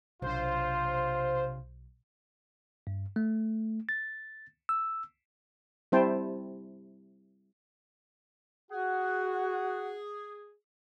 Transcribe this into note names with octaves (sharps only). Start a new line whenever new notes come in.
B1 C3 D4 F4 C5
G2
A3
A6
E6
G3 C4 E4 C5 G5 A5
F#4 G#4 F#5